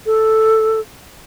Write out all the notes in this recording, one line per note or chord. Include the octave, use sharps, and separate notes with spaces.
A4